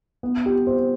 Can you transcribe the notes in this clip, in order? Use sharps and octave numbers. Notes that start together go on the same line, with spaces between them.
B3
G4
C5